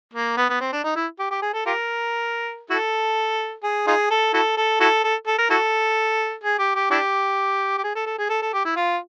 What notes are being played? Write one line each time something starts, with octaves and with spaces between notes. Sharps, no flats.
A#3
B3
B3
C4
D4
D#4
E4
G4
G4
G#4
A4
F4 G4 A#4
E4 F#4 A4
G#4
D#4 F4 G#4
A4
E4 F#4 A4
A4
E4 F#4 A4
A4
A4
A#4
E4 F#4 A4
G#4
G4
G4
D4 E4 G4
G4
G#4
A4
A4
G#4
A4
A4
G4
E4
F4